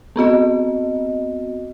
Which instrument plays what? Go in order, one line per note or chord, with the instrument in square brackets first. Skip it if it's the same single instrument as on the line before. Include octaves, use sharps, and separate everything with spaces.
[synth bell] B3 C4 F#4 D#5